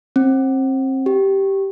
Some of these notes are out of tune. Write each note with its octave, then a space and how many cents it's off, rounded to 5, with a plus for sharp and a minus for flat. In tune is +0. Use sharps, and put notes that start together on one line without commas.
C4 +30
G4 -10